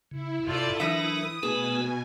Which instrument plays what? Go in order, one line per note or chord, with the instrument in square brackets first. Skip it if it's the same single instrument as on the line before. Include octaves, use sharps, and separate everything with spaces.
[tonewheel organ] C#3 [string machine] E4
[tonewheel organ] G2 C3 [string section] F4 A4 D5
[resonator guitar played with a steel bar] E3 E5 [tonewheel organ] F#3 D4 A#4 [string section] D#6
[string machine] B2 G#5 [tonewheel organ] A3 B3 B4 [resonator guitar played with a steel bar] G#4